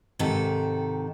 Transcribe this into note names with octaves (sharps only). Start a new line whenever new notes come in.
G#2 C3 D#3 A4